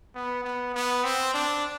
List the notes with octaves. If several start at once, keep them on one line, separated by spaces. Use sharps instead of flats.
B3
B3
B3
C4
D4